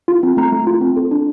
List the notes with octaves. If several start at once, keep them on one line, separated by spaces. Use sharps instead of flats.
F4
C4
A3 A#5
A3
F4
C4
A4
D4